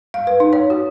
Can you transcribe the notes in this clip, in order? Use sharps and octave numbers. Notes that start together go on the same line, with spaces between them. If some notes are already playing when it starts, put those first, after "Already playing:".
F5
B4
D#4
C#5
F#4